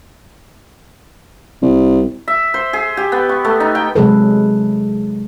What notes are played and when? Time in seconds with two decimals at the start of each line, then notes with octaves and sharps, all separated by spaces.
1.62 C2
2.28 E5
2.54 C5
2.73 G#4
2.97 G4
3.12 B3
3.29 C#6
3.45 A3
3.60 D#4
3.75 G5
3.95 C3 F#3 G#3 G#4 A4 B4